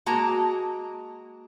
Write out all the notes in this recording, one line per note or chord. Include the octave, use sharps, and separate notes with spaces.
G#3 A#3 F#4 A5 A#5